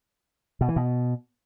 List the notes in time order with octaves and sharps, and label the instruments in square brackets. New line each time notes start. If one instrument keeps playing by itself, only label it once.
[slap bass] B2
E3
B2